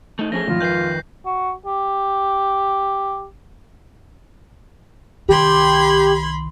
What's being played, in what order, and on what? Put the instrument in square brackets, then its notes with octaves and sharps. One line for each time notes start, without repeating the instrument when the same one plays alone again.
[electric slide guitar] A3 D#4
[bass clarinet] F3 [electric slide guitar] A3 C#4 G#4 [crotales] A#6
[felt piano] G#1 F2 [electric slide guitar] A2 [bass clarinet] F4
[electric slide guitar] D#3 B4 [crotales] G6 C7
[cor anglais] F#4
G4
[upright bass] C2 D#3 [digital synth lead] G4 [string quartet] B5 C6 G#6